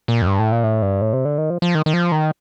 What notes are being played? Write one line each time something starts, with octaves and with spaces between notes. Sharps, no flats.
A#2
F2
G2
A2
A#2
A2
G2
A2
C3
D3
D#3
F3
F3
D#3
D#3
F3
D#3